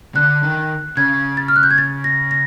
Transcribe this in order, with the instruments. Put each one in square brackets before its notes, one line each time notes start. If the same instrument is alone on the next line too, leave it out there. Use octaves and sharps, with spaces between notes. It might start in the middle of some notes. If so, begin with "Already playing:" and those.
[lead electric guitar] D3 [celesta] F#6
[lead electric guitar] D#3
[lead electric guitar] C#3 [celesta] G#6
[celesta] A6
F6
F#6
G6
G#6
A6
A#6
A#6